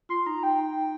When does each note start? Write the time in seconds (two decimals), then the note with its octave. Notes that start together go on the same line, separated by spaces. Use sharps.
0.09 F4 C6
0.26 D#4 A#5
0.43 G5